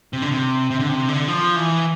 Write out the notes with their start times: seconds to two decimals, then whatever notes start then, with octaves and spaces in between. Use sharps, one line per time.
0.13 C3
0.22 D3
0.31 C3
0.71 C3
0.79 D3
0.89 C3
1.09 D3
1.28 F3
1.56 E3